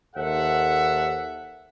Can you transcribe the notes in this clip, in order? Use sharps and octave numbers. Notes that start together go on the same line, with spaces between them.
D#2 D#4 A4 C5 E5 F#5